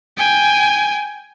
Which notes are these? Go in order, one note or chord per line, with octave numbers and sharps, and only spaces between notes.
G5 G#5